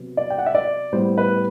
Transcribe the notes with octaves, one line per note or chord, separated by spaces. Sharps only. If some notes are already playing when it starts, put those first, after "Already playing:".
Already playing: C3 F#3 B3
D5
G5
F#5
E5
D5
A2 G3 B3 C5
B4